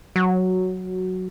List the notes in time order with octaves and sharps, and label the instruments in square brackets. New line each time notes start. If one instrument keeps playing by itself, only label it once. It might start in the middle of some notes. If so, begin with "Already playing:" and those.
[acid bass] F#3